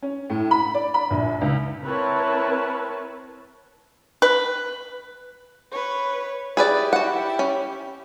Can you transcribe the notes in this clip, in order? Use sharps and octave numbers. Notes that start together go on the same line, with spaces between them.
C#4
A2
B5
D5
B5
A#1
C#2
C4 E4 A#4 B4 C#5 A5
B4
B4 C#5
E4 G4 G#4 B4 D5
F#4 F#5
C#4